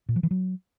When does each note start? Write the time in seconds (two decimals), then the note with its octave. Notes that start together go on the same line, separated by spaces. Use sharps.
0.09 A#2
0.16 F3
0.23 E3
0.31 F#3